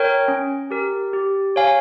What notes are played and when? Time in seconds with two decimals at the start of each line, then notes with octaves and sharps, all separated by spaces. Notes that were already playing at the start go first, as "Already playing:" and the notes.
Already playing: A#4 C#5 G5
0.28 C#4
0.70 G4 A#4
1.13 G4
1.56 C#5 F5 G#5